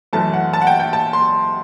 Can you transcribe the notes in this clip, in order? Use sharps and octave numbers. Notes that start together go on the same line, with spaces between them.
F#2 E3 A3 A5
F#5
A5
F#5
G5
G5
A5
C6